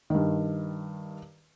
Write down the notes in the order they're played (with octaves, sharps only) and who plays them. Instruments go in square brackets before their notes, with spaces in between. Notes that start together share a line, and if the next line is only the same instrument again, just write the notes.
[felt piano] G2 D#3